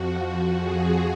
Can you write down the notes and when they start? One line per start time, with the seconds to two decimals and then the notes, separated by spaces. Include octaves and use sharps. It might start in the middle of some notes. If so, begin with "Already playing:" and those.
Already playing: F2 F3 F#4
0.56 G#4